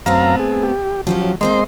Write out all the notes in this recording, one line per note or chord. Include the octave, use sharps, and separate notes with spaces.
F#2 A3 B3 C4 F5 A#5
G#4
G4
F3 F#3 C#4 G4
G#3 A#3 C4 C5 D#5 C6